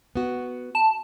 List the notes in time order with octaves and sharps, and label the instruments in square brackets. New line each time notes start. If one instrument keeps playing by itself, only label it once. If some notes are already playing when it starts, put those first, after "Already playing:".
[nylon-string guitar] B3 F#4
[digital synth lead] A5